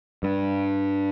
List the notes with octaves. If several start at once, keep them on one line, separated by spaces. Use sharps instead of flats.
G2